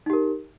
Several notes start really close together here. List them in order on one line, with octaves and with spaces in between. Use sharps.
D#4 G4 A#4